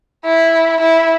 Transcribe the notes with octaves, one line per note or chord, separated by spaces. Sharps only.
E4
E4